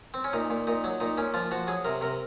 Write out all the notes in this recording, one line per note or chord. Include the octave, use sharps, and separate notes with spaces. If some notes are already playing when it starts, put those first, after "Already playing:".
C4
C#4
A#2 D#4
A#2
A#2 D#4
F#3
A#2 D#4
A#2 C#4
F3 F4
F3 F#4
F#3 G#4
C3 A#4
C3 A#4